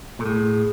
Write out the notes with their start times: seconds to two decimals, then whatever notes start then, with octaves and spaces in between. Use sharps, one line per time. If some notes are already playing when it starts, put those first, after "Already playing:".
0.19 A#2 A4
0.25 A2 G#4